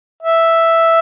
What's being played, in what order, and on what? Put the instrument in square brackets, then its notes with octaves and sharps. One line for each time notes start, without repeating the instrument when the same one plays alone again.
[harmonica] E5